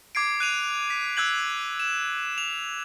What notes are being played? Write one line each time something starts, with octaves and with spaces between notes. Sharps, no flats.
D6 G#6 C7 D7
F#6 D#7 F7
B6
E6 F#6 G#6 F#7
E7
F7